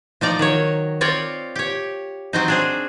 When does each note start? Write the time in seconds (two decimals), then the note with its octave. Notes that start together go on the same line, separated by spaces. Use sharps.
0.21 F3 D#4 D5 A#5
0.39 D#3 F#3 C#5
1.01 C4 F4 C#5 D5
1.56 G4 C#5
2.33 F#3 C4 D#4
2.48 D4 G#4 C5